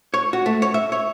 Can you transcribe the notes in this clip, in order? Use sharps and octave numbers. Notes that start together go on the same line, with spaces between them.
C#5
F#4
A3
C#5
E5
C#5